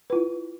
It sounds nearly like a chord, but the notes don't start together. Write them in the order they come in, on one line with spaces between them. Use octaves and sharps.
B4 F4 E4